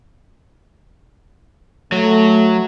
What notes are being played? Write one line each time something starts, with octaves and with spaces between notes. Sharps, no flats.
F#3 A3